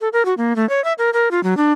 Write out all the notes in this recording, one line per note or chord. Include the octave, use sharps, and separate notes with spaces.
A4
A#4
F#4
A#3
A3
C#5
E5
A#4
A#4
F4
F#3
D4